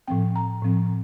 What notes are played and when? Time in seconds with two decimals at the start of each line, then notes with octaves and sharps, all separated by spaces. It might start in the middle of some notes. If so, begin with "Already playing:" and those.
0.08 A2 F3 C4 G5
0.36 A#5
0.63 A2 F3 C4